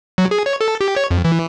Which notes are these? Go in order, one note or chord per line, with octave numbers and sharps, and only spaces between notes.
F#3
G#4
C#5
A4
G4
C#5
F2
E3